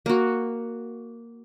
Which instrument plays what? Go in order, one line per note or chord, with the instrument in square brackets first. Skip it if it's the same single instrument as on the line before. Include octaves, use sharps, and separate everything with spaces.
[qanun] A#3 F#4